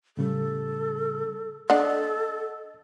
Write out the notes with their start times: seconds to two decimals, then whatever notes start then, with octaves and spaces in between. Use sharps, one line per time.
0.17 A2 C#3 G3 A4
1.70 D4 A4 D#5 F#5